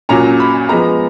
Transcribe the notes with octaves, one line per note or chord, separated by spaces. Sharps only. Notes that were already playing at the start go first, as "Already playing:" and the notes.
A#2 F#3 C#4 A#5
B5
F3 G#3 B3 A#5